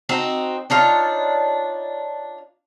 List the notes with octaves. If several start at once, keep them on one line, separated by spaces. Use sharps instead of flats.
C4 D#4 F#4
D4 D#4 F4 C#5